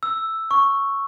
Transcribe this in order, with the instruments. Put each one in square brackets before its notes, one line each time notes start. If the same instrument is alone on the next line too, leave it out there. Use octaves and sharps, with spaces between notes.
[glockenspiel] E6
C#6